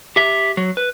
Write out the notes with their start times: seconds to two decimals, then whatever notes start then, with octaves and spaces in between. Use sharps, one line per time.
0.16 G4 E5
0.57 F#3
0.77 B4